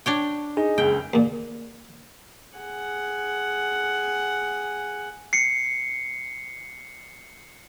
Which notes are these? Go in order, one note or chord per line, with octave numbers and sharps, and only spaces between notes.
D4 C#5 G5
D#4 G#4
F#1 C#2 G5
D#2 A#2
G#4 F#5
C7 C#7